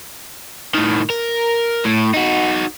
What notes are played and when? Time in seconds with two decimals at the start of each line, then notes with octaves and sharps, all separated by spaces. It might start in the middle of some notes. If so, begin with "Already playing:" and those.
0.74 A2 D#3
1.10 A#4
1.85 A2
2.14 D#4 F#4